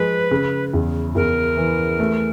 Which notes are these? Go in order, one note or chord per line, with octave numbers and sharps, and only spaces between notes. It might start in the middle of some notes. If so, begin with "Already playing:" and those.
Already playing: F3 G#3 B4
C#3
E2
E2 A#4
E3
A3